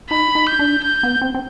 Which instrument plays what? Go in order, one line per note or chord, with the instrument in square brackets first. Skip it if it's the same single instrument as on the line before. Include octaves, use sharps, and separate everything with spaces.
[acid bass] D#4 [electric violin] B5
[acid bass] D#4
[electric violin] G6
[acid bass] D4
[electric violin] G6
[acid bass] B3
C4
C4